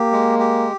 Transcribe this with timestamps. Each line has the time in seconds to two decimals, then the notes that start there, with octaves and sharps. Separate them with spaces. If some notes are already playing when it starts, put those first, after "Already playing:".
Already playing: A#3 G4
0.12 G#3
0.39 G4